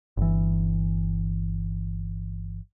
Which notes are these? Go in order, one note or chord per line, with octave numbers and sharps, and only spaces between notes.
G1 E3